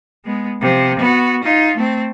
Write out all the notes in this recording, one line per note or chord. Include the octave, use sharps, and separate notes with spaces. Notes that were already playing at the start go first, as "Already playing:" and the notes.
G#3 B3
C3 F3
B3 F#4
D#4 F4
A3 C4